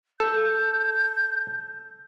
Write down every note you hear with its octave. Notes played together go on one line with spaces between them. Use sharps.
A4 G6